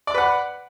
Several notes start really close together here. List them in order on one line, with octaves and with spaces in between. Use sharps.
D5 D6 B4 F#5 B5